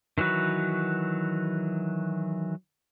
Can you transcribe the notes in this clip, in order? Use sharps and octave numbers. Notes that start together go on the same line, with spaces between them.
D#3 E3 F#3 F#4 B4